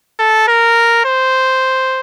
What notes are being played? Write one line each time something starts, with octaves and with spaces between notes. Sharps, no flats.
A4
A#4
C5